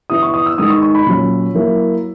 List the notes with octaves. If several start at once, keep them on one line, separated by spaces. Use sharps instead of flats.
E3 B3 E4 D#6
C#6
D#6
E6
D#3 G#3 D#4 D#6
C#6
C#6
B5
A#2 F#3 C#4
F#3 A#3 E4